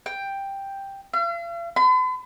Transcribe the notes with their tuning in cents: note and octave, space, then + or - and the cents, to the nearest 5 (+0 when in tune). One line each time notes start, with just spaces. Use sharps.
G5 +5
F5 -45
B5 +45